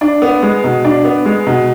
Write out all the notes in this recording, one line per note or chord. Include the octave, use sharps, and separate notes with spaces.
D4
B3
G#3
B2
D4
B3
G#3
B2